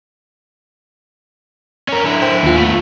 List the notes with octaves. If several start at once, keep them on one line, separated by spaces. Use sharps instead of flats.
C#4 A#4
D3 E4
C5 G5
D#2 F4
A3 B3